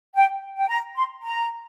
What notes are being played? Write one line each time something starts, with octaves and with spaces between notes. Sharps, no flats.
G5
G5
A#5
C6
A#5